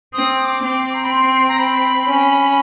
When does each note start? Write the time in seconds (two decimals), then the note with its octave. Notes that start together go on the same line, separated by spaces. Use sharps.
0.13 C4 D#6
0.38 D#6
0.45 D6
0.62 C4
0.94 A#5
1.03 B5
1.11 C6
1.48 A#5
1.59 B5
2.08 C#4